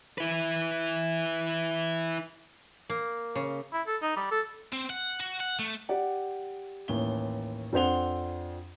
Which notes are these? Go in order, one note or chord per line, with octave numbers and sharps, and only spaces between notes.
E4 B4
A#3
C#3
E4
A4
D#4
G3
A4
C4
F#5
F#4
F#5
A3
G4 D5 F#5
A1 D#2 G7
F2 D4 C5 F#5 F7 G7